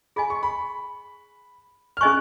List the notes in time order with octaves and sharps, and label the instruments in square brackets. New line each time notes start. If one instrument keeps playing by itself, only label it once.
[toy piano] G#4 D#5 G#5 [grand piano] B5
[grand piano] C#6
B5
F6
[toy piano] C#4 G#4 D#5 G#5 C#6 [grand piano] F#6